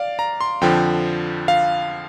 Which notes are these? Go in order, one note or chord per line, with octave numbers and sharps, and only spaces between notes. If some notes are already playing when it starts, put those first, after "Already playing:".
Already playing: D5 F5
A#5
C6
F2 D3 F3 G5
F5